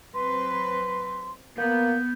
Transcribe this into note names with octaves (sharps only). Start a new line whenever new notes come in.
F#3 C4 B4 C6
A#3 B3 G6